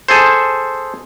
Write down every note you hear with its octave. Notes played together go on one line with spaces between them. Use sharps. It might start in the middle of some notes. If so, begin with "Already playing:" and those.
G#4 A4 C5